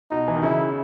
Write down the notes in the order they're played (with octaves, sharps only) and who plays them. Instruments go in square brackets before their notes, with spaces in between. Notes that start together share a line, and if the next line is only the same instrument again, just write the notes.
[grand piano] B2 [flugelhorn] D#4
[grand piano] E3
D#3
[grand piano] C#3 [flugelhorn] E4